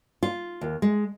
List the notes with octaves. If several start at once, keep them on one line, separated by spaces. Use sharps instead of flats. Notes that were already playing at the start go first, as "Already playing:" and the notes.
F4
D#2
G#3